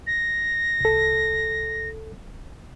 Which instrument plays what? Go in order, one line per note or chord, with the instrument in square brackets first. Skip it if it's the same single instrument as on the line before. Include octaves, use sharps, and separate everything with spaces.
[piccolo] A#6
[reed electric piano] C2 A4